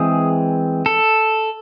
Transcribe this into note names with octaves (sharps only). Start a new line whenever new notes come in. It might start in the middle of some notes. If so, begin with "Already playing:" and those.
Already playing: E3 G#3 C4 G#4
A4